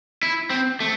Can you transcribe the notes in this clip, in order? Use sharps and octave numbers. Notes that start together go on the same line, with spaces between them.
E4
C4
A3